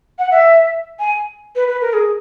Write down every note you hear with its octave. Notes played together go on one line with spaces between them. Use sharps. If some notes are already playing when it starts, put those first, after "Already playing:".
F#5
E5
G#5
B4
B4
A#4
G#4